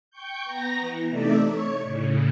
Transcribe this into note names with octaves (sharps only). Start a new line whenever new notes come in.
G5 C#6 G6
B3 A#5 A#6
E3
C3 A3 D#4 A4 D5 E5
C#5 C#6
A2 C#3